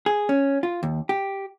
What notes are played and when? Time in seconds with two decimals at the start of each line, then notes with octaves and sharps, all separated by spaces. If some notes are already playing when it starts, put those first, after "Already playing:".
0.06 G#4
0.29 C#4
0.63 F4
0.83 D#2
1.09 G4